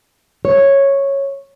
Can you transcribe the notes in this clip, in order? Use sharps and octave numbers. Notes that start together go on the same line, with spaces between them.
C#5